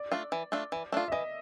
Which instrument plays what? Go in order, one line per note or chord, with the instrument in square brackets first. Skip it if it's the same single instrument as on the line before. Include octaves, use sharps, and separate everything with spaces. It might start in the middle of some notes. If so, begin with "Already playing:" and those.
Already playing: [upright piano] D5
[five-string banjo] A3 D4 F4
E3
A3 D4 F4
E3
A3 D4 F4
[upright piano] E5
[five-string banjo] E3 [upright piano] D#5